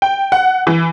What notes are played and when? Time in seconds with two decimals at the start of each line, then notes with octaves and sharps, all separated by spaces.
0.02 G5
0.32 F#5
0.67 E3